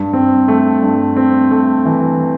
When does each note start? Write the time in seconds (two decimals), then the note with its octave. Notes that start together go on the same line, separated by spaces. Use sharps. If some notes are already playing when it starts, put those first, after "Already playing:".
Already playing: G2
0.13 C4
0.48 A3
0.83 G2
1.17 C4
1.51 A3
1.85 E3